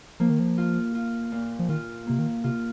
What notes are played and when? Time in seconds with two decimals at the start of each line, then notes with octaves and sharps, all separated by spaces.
0.20 F3 A#3
0.30 D#3
0.40 F3
0.58 F4
0.95 F4
1.32 A#2
1.59 F3
1.69 D#3 F4
2.07 C3 A#3
2.19 D#3
2.44 C3 F4